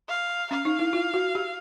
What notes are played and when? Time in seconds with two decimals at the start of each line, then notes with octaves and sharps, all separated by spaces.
0.09 F5
0.51 C#4 F5
0.65 D#4
0.79 E4
0.93 F4
1.14 F#4
1.35 G4